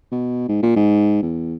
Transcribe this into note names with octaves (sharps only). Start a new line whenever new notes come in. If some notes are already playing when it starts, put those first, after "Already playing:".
B2
G#2
A#2
G#2
E2